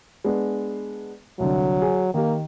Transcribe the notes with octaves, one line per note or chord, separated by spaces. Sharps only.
G#3 B3 D4
C2 D3 F#3
G#4
D#3 A#3 G4